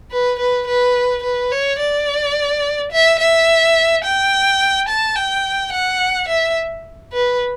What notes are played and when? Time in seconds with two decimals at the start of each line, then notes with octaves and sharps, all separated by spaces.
0.11 B4
0.39 B4
0.67 B4
1.23 B4
1.52 C#5
1.79 D5
2.91 E5
3.19 E5
4.04 G5
4.89 A5
5.16 G5
5.72 F#5
6.28 E5
7.13 B4